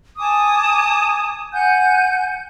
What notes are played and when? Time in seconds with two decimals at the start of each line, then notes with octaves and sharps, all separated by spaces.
0.18 G#5 A5 D6 D#6
1.52 F#5 G#5 F#6 G6